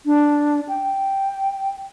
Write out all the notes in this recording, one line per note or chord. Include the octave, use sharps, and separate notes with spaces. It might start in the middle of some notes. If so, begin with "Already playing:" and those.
D4
G5